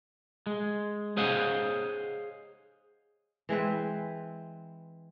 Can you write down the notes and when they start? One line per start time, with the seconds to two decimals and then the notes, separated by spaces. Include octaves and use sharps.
0.47 G#3
1.17 G#4 C5 C#5 D#5 F5 F#5
3.49 E3 G#3 C4 B4